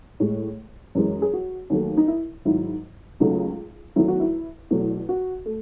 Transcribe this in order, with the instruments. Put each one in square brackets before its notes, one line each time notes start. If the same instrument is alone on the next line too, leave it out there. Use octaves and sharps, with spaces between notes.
[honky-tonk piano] A2 G#3
F#2 E3 G#3
G#4
F#4
D#2 D#3 F#3 A3
D#4
E4
G#2 D#3 F#3 E4
C#2 C#3 F#3 A3 D#4
E2 D#3 F#3 A3 E4
F#4
E4
E2 B2 F#3 A3
F#4
A3